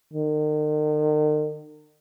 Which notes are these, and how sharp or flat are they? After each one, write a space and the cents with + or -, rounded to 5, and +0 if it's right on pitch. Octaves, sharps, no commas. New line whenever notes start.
D#3 -40